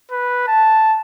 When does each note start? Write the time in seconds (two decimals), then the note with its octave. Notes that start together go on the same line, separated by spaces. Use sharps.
0.11 B4
0.48 A5